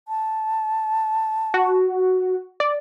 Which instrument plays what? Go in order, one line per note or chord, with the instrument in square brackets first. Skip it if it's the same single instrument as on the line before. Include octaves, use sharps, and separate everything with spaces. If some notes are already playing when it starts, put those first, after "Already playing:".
[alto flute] A5
[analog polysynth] F#4
D5